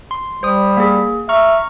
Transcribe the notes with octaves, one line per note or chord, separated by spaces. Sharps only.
C6
G3 C5 D#6
A#3 G#4
E5 A#5 C#6 F6